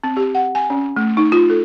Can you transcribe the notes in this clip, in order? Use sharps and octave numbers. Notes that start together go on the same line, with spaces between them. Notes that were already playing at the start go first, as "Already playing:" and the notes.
C4
G4
F#5
G#5
C#4
A3
D#4
F4
A4